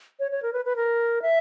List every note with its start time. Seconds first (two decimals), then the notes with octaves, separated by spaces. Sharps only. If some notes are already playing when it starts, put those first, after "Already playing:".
0.19 C#5
0.31 C#5
0.43 A#4
0.53 B4
0.65 B4
0.76 A#4
1.22 E5